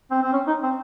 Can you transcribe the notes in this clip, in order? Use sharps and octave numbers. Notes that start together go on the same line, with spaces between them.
C4
C4
C#4
D#4
C4